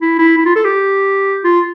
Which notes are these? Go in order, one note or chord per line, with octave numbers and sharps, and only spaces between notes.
E4
E4
E4
F4
A4
G4
F4